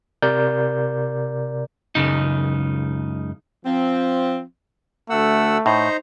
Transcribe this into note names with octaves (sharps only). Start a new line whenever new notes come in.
C3 A#4 D5 G6
C#2 F#2 C#3 D#4
F3 C4
D2 A3 F#5 E6
A2 D#4 C5 A#5